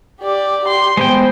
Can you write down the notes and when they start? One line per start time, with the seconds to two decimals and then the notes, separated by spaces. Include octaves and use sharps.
0.21 G4 D5
0.64 G4 C6
0.97 G#3 B3 C5 G5